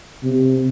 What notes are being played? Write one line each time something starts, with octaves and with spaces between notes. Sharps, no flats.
C3